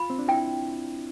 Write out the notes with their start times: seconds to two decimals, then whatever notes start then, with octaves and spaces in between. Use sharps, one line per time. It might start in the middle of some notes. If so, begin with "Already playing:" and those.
Already playing: F4 B5
0.10 C4
0.19 D4
0.28 E4 G5